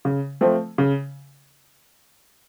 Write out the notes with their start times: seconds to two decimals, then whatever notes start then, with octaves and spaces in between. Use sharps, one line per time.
0.05 C#3
0.41 F3 A3 C4
0.78 C#3